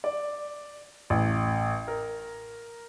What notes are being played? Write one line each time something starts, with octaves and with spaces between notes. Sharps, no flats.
D5
A1
A#4